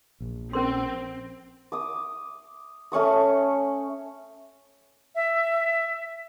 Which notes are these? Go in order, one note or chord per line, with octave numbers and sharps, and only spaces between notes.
A#1
C4 C#4 A#4 C6
D6 D#6
A3 C#4 C#6 D#6
E5